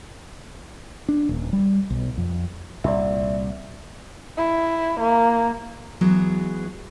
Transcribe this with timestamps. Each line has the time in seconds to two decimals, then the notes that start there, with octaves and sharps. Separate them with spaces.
1.09 D4
1.29 D#1
1.53 G3
1.90 B1
2.18 F2
2.84 C2 A#2 D5 E5
4.37 E4
5.00 A#3
6.01 E3 F#3 G#3 B3 F#4 G#4